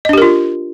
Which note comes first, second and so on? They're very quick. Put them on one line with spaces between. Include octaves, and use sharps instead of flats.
D#5 D4 G4 A#4 F4